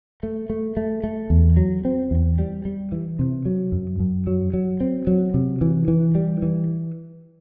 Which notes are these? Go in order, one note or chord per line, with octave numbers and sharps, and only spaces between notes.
A3
A3
A3
A3
E2
F#3
C4
E2
G3
G3
E3
C3
F#3
F#2
F#2
F#3
F#3
C4
F#3
C3
E3
E3
G3
E3